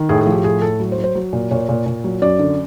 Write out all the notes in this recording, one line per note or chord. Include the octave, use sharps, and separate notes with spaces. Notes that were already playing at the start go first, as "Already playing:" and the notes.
Already playing: D#3
A2 G#4
G#4
F3
G4
A2 G#4
A2 A4
F#3
C5
F#3
C5
F#3
A#2
A#2 C#5
A#2
A#2
F#3
F#2 D5
D3